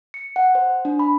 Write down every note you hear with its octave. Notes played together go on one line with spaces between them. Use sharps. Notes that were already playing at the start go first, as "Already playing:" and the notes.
C#7
F#5
C5
D4
B5